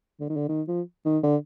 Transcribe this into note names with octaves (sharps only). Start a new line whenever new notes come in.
D3
D#3
D3
D#3
F3
D#3
D3